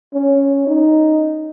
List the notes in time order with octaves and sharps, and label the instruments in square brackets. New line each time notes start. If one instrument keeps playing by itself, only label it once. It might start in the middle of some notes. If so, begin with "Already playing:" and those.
[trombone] C#4
D#4